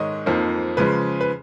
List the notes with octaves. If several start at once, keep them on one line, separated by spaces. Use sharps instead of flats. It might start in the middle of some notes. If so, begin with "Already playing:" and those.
Already playing: G#2 D#3 G#3 C#5 D#5
F2 F3 A#3 D#4
C#3 F3 G#3 B4
B4